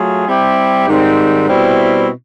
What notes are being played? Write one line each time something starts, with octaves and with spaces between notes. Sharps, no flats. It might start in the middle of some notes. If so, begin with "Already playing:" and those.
Already playing: F#3 A3 F4 G#4
G3 C4 E4 G4
G#2 D#3 G3 C4
B2 G3 C4 E4